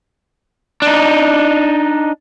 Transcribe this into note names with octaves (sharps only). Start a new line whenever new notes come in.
D4 D#4